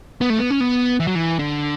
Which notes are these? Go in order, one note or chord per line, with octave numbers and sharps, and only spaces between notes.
B3
A3
B3
C#4
B3
E3
F#3
E3
D3